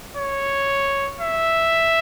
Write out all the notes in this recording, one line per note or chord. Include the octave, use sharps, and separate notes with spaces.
C#5
E5